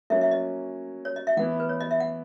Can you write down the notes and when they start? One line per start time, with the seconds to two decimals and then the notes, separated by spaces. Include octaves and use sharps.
0.10 F#3 A#3 C#4 E5
0.21 E5
0.31 D#5
1.05 C#5
1.16 D#5
1.27 E5
1.37 E3 B3 E4 F#5
1.60 B4
1.69 C#5
1.81 D#5
1.91 E5
2.00 F#5